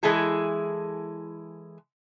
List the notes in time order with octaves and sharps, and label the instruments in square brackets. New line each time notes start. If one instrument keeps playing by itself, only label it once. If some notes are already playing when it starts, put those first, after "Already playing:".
[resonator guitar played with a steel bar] E3 G#3 E4 G#4 A4